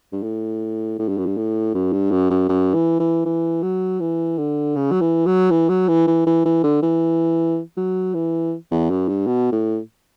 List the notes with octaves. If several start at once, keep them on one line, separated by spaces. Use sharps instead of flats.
G2
A2
A2
G2
F#2
G2
A2
F#2
G2
F#2
F#2
F#2
E3
E3
E3
F#3
E3
D3
C#3
F#3
E3
F#3
E3
F#3
E3
E3
E3
E3
D3
E3
F#3
E3
E2
F#2
G2
B2
A2